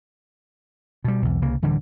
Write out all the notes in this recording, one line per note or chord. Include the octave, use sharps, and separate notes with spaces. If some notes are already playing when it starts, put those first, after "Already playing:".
B2 G3
B1 E2
C2 C#3 A#3
D1 D3 E3 G3